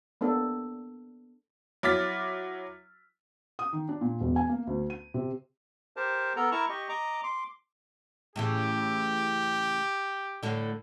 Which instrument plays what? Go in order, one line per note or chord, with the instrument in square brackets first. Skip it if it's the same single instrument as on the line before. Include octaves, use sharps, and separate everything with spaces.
[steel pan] A#3 B3 D4 A4
[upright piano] F#3 E4 D6 F6 A6 B6
[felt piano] D#6
D#3
D4
A#2
E1
G#5
A#3
D2
D#7
C3
[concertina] G4 A#4 C5 A5
B3 A4 A#4 A#5
E4 A#4 A5 A#5 C#6
G4 D#5 C#6
D#5 A#5 D6
C6 D6
[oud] A2 C#3 E3 [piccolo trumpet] G4
[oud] A2 D3